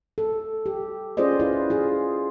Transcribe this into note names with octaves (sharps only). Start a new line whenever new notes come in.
A4
G4
C#4 F4 G#4 C5 D5 D#5
E4 F4 B4
F4 G#4